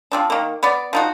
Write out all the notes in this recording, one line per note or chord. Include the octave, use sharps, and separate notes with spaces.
F3 C4 D4
D#3 A#3
B3 D5
F3 D#4 F#4